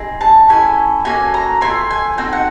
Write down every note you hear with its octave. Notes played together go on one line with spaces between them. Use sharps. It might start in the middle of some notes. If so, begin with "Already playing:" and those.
Already playing: C4 D#4 G#4
A5
C#4 E4 A4 G#5
A#3 C#4 F#4 A4 G#5
A#5
A3 C4 F4 G#5
G#5
C4 D#4 F#4 A4 G5
F#5